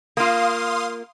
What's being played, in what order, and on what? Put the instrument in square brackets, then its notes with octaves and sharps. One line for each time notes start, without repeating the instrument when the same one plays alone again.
[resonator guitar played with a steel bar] A#3 F4 [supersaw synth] F5 C6 D#6